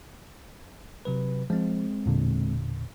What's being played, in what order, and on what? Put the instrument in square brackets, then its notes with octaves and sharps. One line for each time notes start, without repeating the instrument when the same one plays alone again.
[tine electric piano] C3 F#3 B4
[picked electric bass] F3 [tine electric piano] G#3 C4
[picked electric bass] E1 A#2 D3